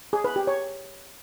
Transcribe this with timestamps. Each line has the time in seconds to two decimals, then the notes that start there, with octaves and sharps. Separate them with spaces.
0.13 G#4
0.24 B4
0.36 G4
0.47 C#5